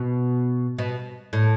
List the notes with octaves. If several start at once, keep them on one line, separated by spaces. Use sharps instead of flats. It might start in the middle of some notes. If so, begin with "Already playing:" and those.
Already playing: B2
B2
A2